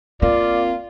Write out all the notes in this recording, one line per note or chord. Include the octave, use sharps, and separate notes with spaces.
A#3 C4 F4 D5